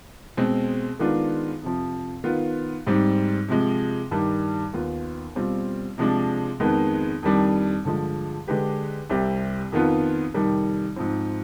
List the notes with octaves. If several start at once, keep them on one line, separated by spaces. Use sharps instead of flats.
B2 G#3 C4
D#3 G#3 B3 D4 F4
F2 C3 F3
D#3 B3 F4
G#2 G3 C4
C3 F3 G#3
G2 D#3 G3
D#2 D#3 B3 F4
B2 G3 C4 F4
C3 F3 G#3 D4
F2 D#3 G#3 B3
F2 D#3 G3 D4
G2 D3 F3 G#3
D3 G#3 D4 G4 B4
C2 C3 G3 C4 G4
F2 D#3 B3 F4
F2 C3 D#3 G3
G#2 F3 C4